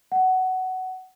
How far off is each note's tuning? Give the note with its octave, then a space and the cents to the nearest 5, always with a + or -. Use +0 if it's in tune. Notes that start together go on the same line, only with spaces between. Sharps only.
F#5 +15